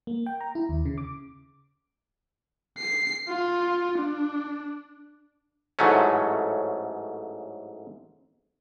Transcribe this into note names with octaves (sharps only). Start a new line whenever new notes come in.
A#3
G5
A#5
E4
D#2
C#3
D6
C7
F4
D4
A1 G#2 F#3 A3 C#4